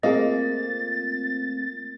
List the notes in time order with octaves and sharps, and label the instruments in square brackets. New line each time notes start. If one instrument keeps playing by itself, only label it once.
[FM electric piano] A3 C4 F4 [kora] A#3 [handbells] G#4 D#5 [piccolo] A6